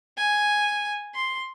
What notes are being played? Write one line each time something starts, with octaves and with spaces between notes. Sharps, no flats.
G#5
C6